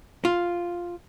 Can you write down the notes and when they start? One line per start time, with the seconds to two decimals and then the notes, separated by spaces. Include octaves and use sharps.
0.25 F4